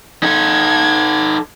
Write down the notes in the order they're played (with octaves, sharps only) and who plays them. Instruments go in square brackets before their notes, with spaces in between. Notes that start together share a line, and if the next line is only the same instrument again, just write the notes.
[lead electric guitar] D#4 A4 [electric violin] G#6